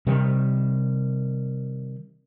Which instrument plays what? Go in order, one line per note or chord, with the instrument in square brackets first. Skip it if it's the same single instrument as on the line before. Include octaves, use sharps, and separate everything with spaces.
[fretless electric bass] C3 D#3 G3